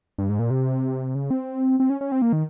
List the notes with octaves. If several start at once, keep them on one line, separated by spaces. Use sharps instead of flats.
G2
G#2
A#2
C3
C#3
C4
C4
C#4
C#4
C4
A#3
D#3